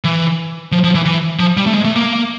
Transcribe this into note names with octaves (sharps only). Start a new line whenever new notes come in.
E3
F3
F3
E3
E3
F3
G3
A3
G#3
A3
A#3